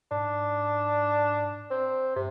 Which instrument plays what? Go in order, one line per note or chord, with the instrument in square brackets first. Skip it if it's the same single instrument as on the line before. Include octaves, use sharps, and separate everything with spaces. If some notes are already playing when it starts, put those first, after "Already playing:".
[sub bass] G#2 [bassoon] D4
[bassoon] C4
[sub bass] G2 [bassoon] C3